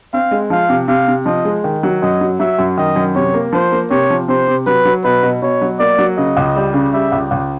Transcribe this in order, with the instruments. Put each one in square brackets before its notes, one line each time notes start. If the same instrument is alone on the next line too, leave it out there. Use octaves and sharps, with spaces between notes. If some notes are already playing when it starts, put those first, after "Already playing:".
[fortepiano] C4 [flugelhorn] F5
[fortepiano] G#3
[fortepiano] F3 [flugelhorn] F5
[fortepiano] C3
[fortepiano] C3 [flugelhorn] F5
[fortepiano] C3
[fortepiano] F3 [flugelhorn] D#5
[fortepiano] G#3
D#3
F#3
[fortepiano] F#2 [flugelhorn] D#5
[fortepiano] F#3
[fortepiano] F#3 [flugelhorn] E5
[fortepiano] F#2
[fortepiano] D#3 [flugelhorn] D#5
[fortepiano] F#2
[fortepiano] C3 [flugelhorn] C#5
[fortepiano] A#3
[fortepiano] F3 [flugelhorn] C5
[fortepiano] A#3
[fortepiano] C3 [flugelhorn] C#5
[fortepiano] F3
[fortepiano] C3 [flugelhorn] C5
[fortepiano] C3
[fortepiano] F#3 [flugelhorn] B4
[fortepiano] F#3
[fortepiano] B2 [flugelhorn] B4
[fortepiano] B2
[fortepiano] B2 [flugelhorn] C#5
[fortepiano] F#3
[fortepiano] A#3 [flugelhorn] D5
[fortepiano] F#3
[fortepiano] C#3 [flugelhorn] D#5
[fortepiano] C#2
G3
C#3
[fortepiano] G3 [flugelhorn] E5
[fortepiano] C#2
C#2